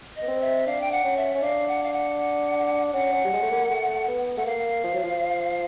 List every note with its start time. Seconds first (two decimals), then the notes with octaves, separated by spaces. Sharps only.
0.16 D#5
0.22 B3
0.28 C4
0.41 E5
0.67 D4 F5
0.81 G5
0.92 F#5
1.04 C#4
1.17 E5
1.35 C#4
1.42 D4 F5
1.68 F#5
1.83 F5
1.93 F#5
2.93 C#4 F#5
3.13 C#4
3.24 G3
3.33 G#3
3.42 A3
3.51 A#3
3.70 A3
4.08 B3
4.37 A3 F#5
4.45 A#3 F5
4.83 F3
4.94 F#3
5.03 F3